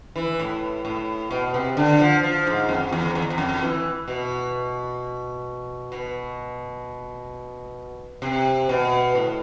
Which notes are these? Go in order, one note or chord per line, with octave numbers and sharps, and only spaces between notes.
E3
A2
A2
B2
C3
D3
F3
F3
G#2
F2
E2
E2
E2
F2
E3
B2
B2
C3
B2
A2